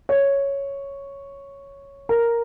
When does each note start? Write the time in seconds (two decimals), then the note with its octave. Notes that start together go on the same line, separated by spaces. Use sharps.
0.09 C#5
2.09 A#4